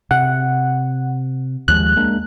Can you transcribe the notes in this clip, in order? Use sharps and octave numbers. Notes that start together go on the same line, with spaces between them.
C3 F#5
D#2 F3 G#3 F#6
G#3 A#3 D4